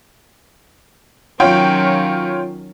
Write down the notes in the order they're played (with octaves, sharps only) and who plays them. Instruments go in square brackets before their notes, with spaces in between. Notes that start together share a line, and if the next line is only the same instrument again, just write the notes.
[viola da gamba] D#3 F#3 C#4 [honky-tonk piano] F4 C#5 G5